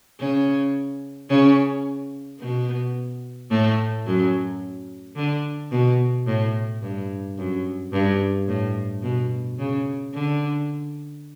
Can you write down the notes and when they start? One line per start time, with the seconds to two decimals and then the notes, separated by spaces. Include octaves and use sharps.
0.19 C#3 C#4
1.30 C#3 C#4
2.40 B2 B3
3.51 A2 A3
4.06 F#2 F#3
5.16 D3
5.71 B2
6.27 A2
6.82 G2
7.38 F#2
7.92 G2
8.48 A2
9.02 B2
9.59 C#3
10.14 D3